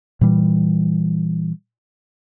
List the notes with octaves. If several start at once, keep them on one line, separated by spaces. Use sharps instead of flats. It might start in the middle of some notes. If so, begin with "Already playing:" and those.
A#2 E3 G3